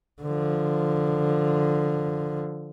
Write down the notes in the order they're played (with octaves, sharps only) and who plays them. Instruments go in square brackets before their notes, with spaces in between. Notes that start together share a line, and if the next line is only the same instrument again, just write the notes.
[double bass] D3 F3